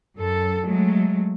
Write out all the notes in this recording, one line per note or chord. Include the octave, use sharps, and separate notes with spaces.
F#2 A4
F#3 G#3 A3